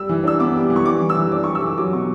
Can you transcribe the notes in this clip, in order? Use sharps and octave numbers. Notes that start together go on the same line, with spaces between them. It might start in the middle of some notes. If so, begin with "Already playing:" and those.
Already playing: G3 E6
E3
D4 E6
B3 D6
G3
E3
C#6
G3 D6
E3
E6
E3
D4 D6
C#6
G3
E6
E3 D6
F#3 D6
B2 C#6